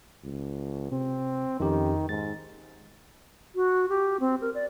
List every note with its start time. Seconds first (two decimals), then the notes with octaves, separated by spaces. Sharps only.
0.24 C#2
0.92 C3 C4
1.60 F2 D#3 C#4 G4
2.09 G#2 A6
3.55 F#4
3.89 G4
4.20 C4
4.41 A#4
4.55 D5